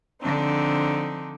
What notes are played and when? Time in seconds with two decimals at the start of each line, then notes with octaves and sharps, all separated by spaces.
0.21 D3 F3 C4 D4 D#4